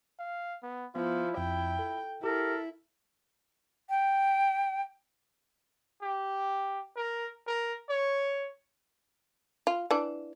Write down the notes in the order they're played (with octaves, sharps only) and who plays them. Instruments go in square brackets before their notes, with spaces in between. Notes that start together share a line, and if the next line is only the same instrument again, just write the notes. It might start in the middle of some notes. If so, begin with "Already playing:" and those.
[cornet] F5
B3
[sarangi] F3 [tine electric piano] B3 [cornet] E4
[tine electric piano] F2 [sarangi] G5
[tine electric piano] A4
[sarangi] E4 [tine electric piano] G4 [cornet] A4 [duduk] A#4
[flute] G5
[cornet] G4
A#4
A#4
C#5
[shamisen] F4
E3 D4